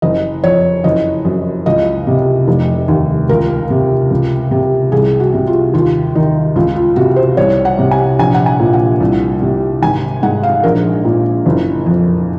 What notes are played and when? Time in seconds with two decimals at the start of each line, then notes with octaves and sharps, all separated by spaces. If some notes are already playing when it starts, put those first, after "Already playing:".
0.02 F#1 D#5
0.43 F2 C#5
0.84 F#1 D#5
1.25 F#2
1.66 C#2 D#5
2.07 C3
2.47 F1
2.88 D#2
3.29 C#2 A#4
3.70 C3
4.11 C#2
4.51 C3
4.92 C2 G#4
5.20 F#4
5.34 C3
5.47 F4
5.73 D#2 F4
6.15 D#3 D#4
6.56 C#2 F4
6.76 F4
6.96 C3 F#4
7.16 C5
7.37 C2 C#5
7.65 F#5
7.79 C3
7.91 G#5
8.19 A#1 G#5
8.34 F#5
8.46 G#5
8.60 A#2
8.73 F#5
9.00 C2
9.42 C3
9.82 G#1 G#5
10.23 G#2 F#5
10.43 F5
10.63 A#1 A#4
11.05 A#2
11.46 F#1
11.86 F2